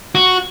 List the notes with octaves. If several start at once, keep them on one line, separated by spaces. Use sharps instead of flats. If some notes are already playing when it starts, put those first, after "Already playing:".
F#4